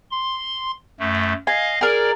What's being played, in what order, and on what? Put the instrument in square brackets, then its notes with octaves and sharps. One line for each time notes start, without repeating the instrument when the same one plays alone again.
[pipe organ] C6
F#2 A3
[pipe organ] D#5 F5 [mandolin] G#5
[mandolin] G#4 A#4 [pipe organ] D5